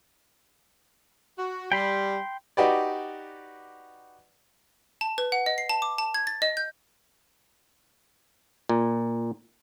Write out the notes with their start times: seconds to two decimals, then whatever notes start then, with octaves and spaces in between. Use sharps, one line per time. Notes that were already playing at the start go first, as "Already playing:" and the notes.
1.38 F#4
1.72 G3 G5 B5 C6
2.57 D#4 F#4 G4 B4 D5
5.01 A5
5.18 B4
5.32 F#5
5.46 D#5
5.58 C7
5.69 A5
5.82 D6
5.98 A5
6.14 G#6
6.27 A6
6.42 D#5
6.57 G6
8.69 A#2